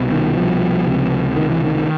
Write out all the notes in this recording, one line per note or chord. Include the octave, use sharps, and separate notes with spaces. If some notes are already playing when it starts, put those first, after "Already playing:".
Already playing: C2 B2
D#3
F3
C#2 C3
D#3
E3
D#3